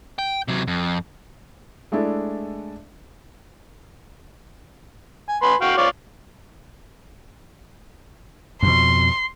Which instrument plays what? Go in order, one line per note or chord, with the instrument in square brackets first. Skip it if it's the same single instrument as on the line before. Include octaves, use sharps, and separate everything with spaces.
[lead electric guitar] G5
C3 F#3
F2
[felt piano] G#3 A3 D4 E4 A4 D5
[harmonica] G#5
B4 G#5 C6
F#4 F5 G5
F4 C#5 D5
[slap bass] F2 B2 [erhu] C6